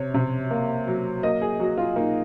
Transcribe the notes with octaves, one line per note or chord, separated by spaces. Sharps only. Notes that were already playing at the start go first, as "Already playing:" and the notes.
Already playing: C3 C#5
C3
A#3
F#3
A#3 D#5
G#4
F#3 F#4
F4
A#3 D#4